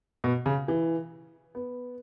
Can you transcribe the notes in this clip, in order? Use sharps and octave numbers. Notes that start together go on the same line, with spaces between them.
B2
C#3
E3
B3